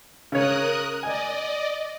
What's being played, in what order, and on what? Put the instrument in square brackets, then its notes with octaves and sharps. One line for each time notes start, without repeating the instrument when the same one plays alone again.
[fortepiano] C#3 C#5 [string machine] A#4 D#6 F#6
[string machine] D5 D#5 [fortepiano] G#5